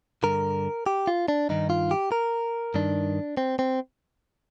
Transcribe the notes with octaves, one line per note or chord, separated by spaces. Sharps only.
G2 D3 A#4
G4
F4
D4
G2 D#3 D#4
F4
G4
A#4
G2 D#3 D4
C4
C4